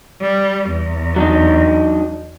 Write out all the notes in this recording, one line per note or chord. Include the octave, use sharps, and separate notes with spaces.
G3
E2
F#3 D4 D#4